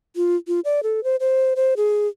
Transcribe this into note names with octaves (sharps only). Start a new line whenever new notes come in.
F4
F4
D5
A4
C5
C5
C5
G#4